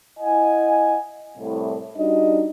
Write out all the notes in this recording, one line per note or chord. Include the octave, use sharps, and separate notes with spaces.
E4 D#5 F#5 G#5
C2 A2
G3 D4 D#4 F#4 D#5